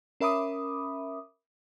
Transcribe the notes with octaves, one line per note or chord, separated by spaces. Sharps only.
C#4 A#4 E5 B5 D6 D#6